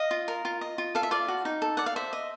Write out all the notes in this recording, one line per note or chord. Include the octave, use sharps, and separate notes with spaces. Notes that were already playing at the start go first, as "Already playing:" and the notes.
Already playing: D#5 F5
F4
A#4
F4
D#5
F4
A4 F5
E5
F4 D5 F5
F#4
D#4
A4
D5 F#5
F5
C5 E5
D#5